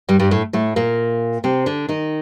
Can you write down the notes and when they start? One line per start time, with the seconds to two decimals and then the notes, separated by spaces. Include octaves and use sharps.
0.08 G2 G3
0.19 G2 G3
0.31 A2 A3
0.53 A2 A3
0.76 A#2 A#3
1.44 C3 C4
1.66 D3 D4
1.89 D#3 D#4